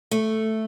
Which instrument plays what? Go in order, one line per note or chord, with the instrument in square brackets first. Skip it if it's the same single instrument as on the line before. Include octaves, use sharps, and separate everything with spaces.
[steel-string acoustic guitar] A3